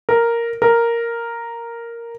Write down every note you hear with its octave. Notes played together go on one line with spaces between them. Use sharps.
A#4
A#4